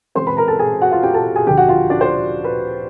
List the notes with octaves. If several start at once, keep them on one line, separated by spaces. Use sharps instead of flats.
C#3 E3 G#3 C4 C5 C6
B4 B5
A#4 A#5
A4 A5
G#4 G#5
F#4 F#5
F4 F5
G4 G5
A4 A5
G#4 G#5
D2 D3 F3 G4 G5
F#4 F#5
F4 F5
D4 D5
C5
B4